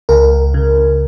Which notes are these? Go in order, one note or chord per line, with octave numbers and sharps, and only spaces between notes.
C#2 A#4
C#3